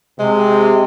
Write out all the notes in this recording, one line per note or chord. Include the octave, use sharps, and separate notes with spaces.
C3 G#3